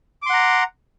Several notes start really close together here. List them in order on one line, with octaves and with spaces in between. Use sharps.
D6 C6 F#5 A#5